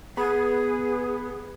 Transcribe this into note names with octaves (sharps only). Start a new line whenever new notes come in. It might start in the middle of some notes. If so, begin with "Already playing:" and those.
B3 G#4